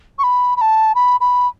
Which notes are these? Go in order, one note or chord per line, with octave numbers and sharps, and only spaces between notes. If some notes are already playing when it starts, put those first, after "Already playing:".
C#6
B5
B5
A5
B5
B5